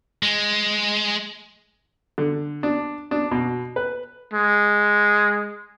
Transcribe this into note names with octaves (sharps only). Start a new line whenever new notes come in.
G#3
D3
D4
D4
B2
B4
G#3